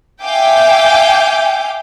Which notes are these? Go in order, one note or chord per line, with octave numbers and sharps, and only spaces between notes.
E5 F5 G5 G#5 D6 G6